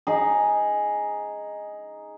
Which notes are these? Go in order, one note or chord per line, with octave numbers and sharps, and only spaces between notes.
D#4 G#4